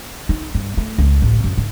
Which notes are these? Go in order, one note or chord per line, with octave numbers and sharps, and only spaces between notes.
D#4
G2
A3
C#2
A1
F#2
G#2